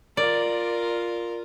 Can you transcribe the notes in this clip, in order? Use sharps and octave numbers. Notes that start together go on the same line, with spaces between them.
F4 A#4 D5